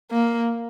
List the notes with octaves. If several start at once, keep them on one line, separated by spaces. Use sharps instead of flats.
A#3